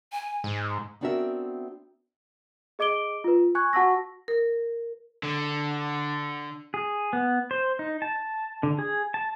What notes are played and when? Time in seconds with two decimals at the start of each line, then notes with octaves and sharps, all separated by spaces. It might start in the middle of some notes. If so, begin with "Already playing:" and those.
0.12 G#5
0.44 G#2
1.01 B3 C4 D4 F#4 A#4 E5
2.79 G#4 D#5 D6 D7 G7
3.24 F4 B4
3.55 G#5 C#6 F#6 G#6
3.73 F#4 F#5 A5 C#6 E6 A#6
4.28 A#4
5.24 D3
6.74 G#4
7.13 B3
7.51 C5
7.79 D#4
8.02 A5
8.63 D3
8.79 G#4
9.14 A5